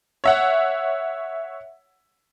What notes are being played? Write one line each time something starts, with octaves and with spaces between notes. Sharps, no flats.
C#5 E5 F#5